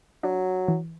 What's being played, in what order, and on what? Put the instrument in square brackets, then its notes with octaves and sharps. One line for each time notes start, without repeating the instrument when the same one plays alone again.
[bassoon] F#3 [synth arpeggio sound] D4
[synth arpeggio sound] E3